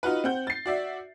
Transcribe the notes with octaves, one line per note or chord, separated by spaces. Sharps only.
D#4 F4 F#4 B4
C4 F#5 G6
A6 C7
F#4 D5 E5